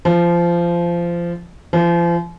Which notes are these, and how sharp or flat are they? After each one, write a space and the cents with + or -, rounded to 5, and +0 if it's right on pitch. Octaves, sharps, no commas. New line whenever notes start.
F3 -20
F3 -35